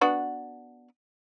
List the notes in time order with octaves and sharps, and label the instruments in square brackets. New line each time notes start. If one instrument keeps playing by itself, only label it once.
[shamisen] B3 D4 F#4